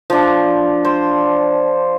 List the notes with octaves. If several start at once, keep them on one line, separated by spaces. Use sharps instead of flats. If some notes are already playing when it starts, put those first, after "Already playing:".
F3 D4
C5